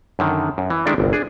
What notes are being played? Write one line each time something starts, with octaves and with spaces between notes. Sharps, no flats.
F#2 D3 D#3
F#2
E3
D#3 G#3 D4 E4 A4 D5
G1 C2
D4 G#4